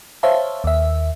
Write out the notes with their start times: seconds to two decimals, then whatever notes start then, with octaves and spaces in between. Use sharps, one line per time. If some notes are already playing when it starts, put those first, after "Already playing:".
0.23 C5 C#5 E5 F5 A5
0.64 D#2 E5